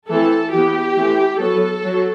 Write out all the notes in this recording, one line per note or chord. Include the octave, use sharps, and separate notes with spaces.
E3 A3 C4 A4
E3 B3 G4
E3 A3 C4
F#3 B3 A4
F#3